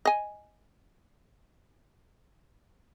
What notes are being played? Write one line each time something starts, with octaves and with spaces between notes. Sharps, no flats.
D#5 G#5